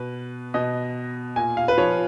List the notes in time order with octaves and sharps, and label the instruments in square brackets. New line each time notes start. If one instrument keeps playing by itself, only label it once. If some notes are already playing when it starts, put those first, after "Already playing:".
Already playing: [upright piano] B2 B4
B2 D#5
A#2 G#5
F5
B4
F3 C#5